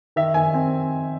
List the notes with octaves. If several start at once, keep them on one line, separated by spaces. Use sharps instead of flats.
D#3 E5
D#3 G#5
C4